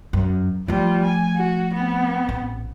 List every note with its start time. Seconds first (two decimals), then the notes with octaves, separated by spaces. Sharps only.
0.13 F#2
0.68 F3 G3 A3 F4
1.05 G#5
1.36 F#4
1.75 B3 C4
2.29 A1